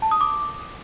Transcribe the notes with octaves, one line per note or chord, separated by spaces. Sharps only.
A5
D#6
D6